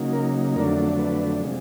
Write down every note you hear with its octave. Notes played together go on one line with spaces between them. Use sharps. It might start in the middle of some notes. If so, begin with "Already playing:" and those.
Already playing: C#3 F#3 A#3 D#4
A#4
F2 D3 F#3 A3 D4 A#4
B4
C3 F3 G#3